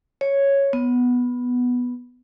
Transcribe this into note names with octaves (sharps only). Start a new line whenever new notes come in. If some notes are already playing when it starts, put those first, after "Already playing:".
C#5
B3